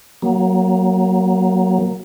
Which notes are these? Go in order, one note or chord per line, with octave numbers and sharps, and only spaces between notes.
F#3 A#3